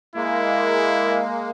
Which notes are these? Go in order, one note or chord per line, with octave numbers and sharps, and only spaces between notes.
G#3 A#3 E4